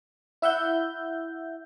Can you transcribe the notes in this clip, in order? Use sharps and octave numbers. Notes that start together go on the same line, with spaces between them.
E4 E5 F#5 G6